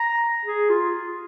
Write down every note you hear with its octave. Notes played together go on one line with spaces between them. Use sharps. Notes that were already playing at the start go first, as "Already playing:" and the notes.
Already playing: A#5
G#4
F4